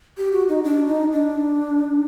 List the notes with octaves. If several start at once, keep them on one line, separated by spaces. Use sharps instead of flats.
G4
F#4
D#4
D4
D#4
D4